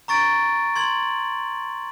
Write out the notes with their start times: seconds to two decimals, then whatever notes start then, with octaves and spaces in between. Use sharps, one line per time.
0.08 A#5 C#6 A6 D7
0.76 C6 G#6 F#7